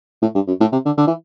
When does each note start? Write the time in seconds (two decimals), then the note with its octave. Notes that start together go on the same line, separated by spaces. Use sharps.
0.22 A2
0.35 G2
0.48 F#2
0.60 A2
0.72 C3
0.86 D3
0.97 D3
1.07 E3